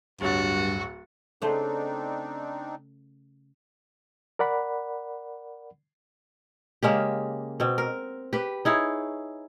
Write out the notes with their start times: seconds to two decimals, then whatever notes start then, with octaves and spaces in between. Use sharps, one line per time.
0.21 D1 G2 F#3 F#4 A6
1.42 C#3 A3 C4 D4 D#4 C5
4.39 A#4 D5 F#5 B5
6.83 C#3 G#3 A#3 G4
7.60 B2 C4
7.78 A#4
8.33 G4 B4
8.65 D#4 E4 G#4 C#5